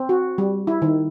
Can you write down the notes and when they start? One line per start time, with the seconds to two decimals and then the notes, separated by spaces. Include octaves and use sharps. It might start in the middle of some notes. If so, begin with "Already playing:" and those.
Already playing: C4
0.09 F#4
0.38 G3
0.67 E4
0.82 D#3